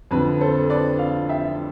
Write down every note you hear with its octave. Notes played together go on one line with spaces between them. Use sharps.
F2 D3 F3 B4
A4 C5
B4 D5
D5 F5
E5 G5